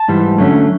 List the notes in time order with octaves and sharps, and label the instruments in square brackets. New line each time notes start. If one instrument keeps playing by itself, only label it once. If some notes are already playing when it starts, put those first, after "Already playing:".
Already playing: [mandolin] A5
[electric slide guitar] G#2 E3 G3
D3 F#3 A3 C#4